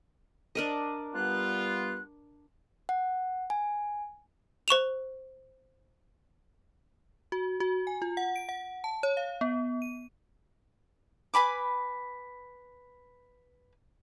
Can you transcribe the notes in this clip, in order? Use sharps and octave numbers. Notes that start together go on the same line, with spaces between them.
D4 A#4 D#5
G3 B3 F4 F#6
F#5
G#5
C5 C#6 E7 F7
F#4
F#4
G#5
F4
F#5
D7
F#5
A5
C#5
F5
B3
D#7
B4 G#5 B5 D6